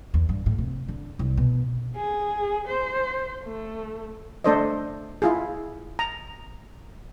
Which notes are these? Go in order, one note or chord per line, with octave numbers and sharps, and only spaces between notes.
E2
G2
A2
C3
D3
C2
B2
G#4
C5
A3
A3 D4 A4 C5 D5 D#5
E4 F4 G#4
A#5